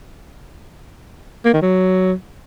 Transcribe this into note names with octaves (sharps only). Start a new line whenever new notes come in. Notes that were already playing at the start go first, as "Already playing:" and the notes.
A#3
D#3
F#3